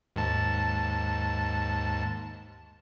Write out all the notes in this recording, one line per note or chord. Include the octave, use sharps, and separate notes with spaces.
D#2 G#2 A5